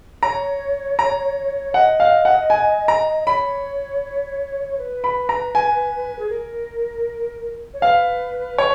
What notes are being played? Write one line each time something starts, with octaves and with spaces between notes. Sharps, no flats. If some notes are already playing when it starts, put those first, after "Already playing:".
C#5 A#5
A#5
D#5 F#5
F5
F#5
G#5
A#5
D#5
C#5 B5
B4
B5
A#5
G#5
G#4
A#4
C#5
B4 F5
C#5